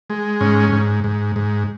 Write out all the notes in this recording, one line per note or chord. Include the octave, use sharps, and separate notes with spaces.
G#3
G#2 C#4
G#2
G#2
G#2